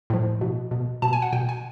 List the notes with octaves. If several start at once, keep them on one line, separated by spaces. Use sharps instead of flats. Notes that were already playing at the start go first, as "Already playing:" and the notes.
A2 F3
B2
B2
B2 A5
G#5
F#5
B2 G5
G#5